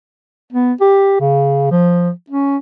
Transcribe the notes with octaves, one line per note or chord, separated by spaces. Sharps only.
B3
G4
C#3
F3
C#4